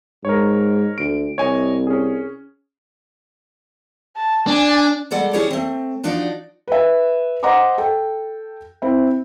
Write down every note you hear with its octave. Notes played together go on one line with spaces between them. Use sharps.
G#2 A#4 C#5
D2 D7
C2 C#5 D#5 G#5
C#4 G#4
A5
D4 G#5
G3 G#3 A4 D5 F#5
C#4 E4 G4 G#4 C#5 D5
A3 C4
F3 D4 D#4 F#4 D5
B4 E5
C5 D#5 F#5 A#5 C6 D6
A4 G5
C4 E4